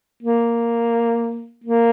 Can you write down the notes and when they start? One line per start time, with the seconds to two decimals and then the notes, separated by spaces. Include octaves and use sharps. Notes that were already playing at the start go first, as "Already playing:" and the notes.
0.23 A#3
1.64 A#3